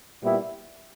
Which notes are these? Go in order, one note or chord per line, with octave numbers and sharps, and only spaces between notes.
A#2 G3 B3 E4